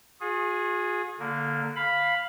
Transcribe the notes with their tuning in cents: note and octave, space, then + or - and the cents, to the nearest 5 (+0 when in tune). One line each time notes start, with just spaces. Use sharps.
F4 +45 G#4 +0
D3 -15 A#3 +0
F5 +0 B5 +0